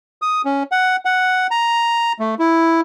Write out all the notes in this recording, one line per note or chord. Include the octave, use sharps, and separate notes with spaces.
D#6
C#4
F#5
F#5
A#5
A3
E4